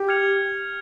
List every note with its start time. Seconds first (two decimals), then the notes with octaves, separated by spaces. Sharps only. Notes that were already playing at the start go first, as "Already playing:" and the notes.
Already playing: G4
0.08 F6 G#6 C#7 F7